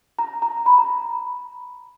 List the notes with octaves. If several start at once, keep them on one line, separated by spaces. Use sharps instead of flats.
A#5
A#5
B5
A#5